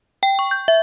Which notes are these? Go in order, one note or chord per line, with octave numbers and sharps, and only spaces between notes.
G5
C#6
G6
E5